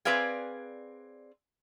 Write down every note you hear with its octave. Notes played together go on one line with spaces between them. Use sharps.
C4 G#4 B4 D5 F5 G#5